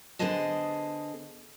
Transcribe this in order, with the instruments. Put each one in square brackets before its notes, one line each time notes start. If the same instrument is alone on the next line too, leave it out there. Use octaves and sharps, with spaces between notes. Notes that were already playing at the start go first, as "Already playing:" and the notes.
[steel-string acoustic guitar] D3 B3 G#4 C5 D#5 A5